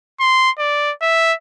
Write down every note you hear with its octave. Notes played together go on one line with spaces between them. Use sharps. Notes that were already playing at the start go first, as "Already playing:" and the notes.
C6
D5
E5